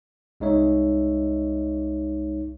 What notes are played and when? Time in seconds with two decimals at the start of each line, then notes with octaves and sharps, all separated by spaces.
0.40 C2 G#3 D#4 C#5 E5